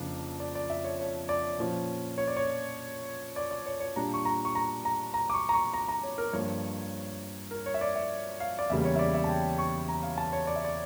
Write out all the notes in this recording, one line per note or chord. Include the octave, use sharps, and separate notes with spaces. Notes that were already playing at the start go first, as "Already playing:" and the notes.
Already playing: F2 C#3 F3 A#3 D4
D5
D5
E5
C#5
C#5
D5
A#2 F3 C#4
C#5
D5
C#5
D5
D5
C#5
C#5
A#2 G3 D4 A#5
C#6
A#5
C#6
A#5
A#5
A#5
D6
C#6
A#5
C#6
A#5
A#5
C#5
A#4
G2 F3 A#3 C#5
A#4
C#5
E5
D5
E5
F5
D5
E2 C#3 G3 A#3 E5
C#5
E5
D5
E5
A5
G5
C#6
A#5
F5
A5
C#5
D5
E5
D5